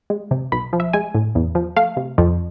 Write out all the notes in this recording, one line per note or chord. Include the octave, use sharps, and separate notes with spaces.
G#3
C3
B1 B5
F3
E5
G#3 G#5
A2
E2
F3
A3 F5
C3
F2